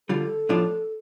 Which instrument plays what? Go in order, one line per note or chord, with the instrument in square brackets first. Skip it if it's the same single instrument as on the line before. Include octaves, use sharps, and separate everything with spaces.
[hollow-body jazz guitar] D3 G3 F4 [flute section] A4
[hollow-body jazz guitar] A2 F3 D4 F4